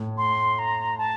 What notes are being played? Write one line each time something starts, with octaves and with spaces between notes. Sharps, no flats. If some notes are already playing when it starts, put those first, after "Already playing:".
Already playing: A2
C6
A#5
A5